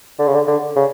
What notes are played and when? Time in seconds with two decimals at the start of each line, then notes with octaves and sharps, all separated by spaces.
0.19 D3
0.27 C#3
0.34 D3
0.47 D3
0.76 C#3